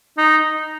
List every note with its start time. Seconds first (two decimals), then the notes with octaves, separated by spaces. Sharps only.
0.18 D#4